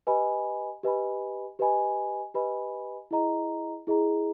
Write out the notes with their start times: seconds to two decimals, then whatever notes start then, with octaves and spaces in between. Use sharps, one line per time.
0.07 G4 B4 D#5 G#5 B5
0.83 G4 B4 D#5 G#5 B5
1.59 G4 B4 D#5 G#5 B5
2.34 G4 B4 D#5 G#5 B5
3.11 E4 G#4 D#5 A#5
3.87 E4 G#4 D#5 A#5